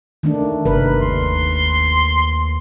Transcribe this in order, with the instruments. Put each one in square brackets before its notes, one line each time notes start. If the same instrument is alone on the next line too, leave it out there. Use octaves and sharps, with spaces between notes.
[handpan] D#3 A3 D4
[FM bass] G1 [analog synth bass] C3 [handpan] A#4 B4
[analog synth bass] D#2 [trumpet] C6